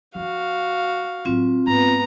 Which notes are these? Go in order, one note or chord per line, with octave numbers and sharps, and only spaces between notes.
F3 D4 F#4 F5
A2 F#3 C4 F4
G#2 B3 A#5